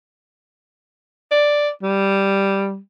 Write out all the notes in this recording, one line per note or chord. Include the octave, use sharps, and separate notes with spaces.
D5
G3